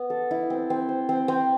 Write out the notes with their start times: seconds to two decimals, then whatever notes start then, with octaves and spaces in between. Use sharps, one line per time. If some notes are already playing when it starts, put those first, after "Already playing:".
Already playing: B3
0.10 A4
0.31 E4
0.50 C4
0.70 C4
0.89 C5
1.09 C4
1.28 C4